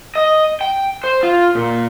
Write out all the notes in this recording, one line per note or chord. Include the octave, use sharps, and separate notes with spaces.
D#5
G5
C5
F4
A#2